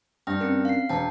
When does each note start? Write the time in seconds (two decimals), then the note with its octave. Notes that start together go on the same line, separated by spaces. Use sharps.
0.27 G2 G5 F6 A#6
0.40 C4 C#4 A#4
0.65 F5 C7
0.89 E1 G5 A5